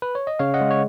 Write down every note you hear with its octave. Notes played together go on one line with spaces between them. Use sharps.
B4
C#5
D#5
C#3 C#5 F5
D#5 F#5
G#3
C#5